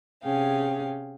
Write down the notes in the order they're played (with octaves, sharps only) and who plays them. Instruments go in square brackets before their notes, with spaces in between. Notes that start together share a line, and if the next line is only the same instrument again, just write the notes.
[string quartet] C3 C#4 G#4 F5 G5